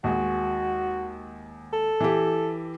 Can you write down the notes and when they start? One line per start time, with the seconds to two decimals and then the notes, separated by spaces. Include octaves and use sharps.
0.04 D#2 G#3 F#4
1.73 A4
2.00 E3 G4